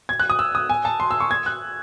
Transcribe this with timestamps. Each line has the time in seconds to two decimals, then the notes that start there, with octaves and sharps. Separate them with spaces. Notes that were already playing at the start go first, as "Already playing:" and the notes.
0.09 G#6
0.20 F#6
0.30 D#6
0.39 E6
0.55 D#6
0.70 G#5
0.85 A5
1.00 C6
1.11 E6
1.20 C#6
1.31 G#6
1.46 F#6